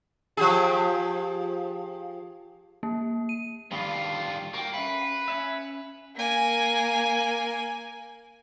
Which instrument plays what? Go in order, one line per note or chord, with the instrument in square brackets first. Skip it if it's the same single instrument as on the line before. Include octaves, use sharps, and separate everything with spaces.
[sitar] F3 G4 G#4
[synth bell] A#3
D#7
[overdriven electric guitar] G2 F4 [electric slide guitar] D3 D#3 G3
[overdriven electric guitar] A#3 [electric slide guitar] F#4 G5
[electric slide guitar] C#4 E5 F5 [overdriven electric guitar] B4
[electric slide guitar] C#4 C#5 E5
[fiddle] A#3 G#5